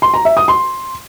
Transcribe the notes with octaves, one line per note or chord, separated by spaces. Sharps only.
C6
A#5
E5
D#6
C6